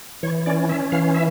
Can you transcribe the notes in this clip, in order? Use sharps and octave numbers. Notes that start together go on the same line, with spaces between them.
E3 C#5
C#4 D5
C#4 E5
E3 F5
E5